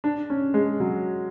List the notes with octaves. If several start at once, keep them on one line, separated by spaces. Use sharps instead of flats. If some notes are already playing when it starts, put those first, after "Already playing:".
D4
C#4
G#3
F#3